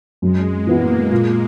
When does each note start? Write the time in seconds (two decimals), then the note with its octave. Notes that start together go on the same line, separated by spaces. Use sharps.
0.22 F#2 G#3
0.67 E3 A#3 B3 E4
1.12 A#2